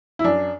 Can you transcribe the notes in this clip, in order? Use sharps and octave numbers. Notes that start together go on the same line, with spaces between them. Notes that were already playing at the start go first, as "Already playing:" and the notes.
E4
F#2 D4